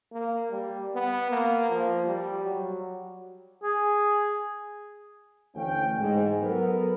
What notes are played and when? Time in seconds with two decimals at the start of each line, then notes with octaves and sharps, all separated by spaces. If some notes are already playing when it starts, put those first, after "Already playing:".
0.12 A#3
0.51 G3
0.95 B3
1.31 A#3
1.70 F3
2.06 G3
2.44 F#3
3.63 G#4
5.55 D2 E3 C#4 F5 G5
5.98 G#2
6.42 F#3 B3 A4 A#4